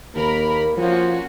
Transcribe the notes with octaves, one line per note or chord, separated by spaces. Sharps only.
D#2 A#3 A#4 B5
F3 A#3 C#4 F4 F#4